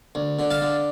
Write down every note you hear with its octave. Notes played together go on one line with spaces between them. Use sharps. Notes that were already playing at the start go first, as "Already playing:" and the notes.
D2
D3
F5 A5
D3